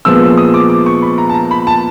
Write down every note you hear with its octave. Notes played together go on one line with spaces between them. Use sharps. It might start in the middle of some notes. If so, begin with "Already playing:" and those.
A#2 F3 G#3 B3 E6
D#6
D6
D6
C#6
B5
A#5
A5
A#5
B5
A5